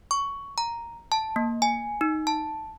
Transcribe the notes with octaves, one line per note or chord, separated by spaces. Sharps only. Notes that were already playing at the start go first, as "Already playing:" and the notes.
C#6
A#5
A5
A#3
G#5
D#4
A5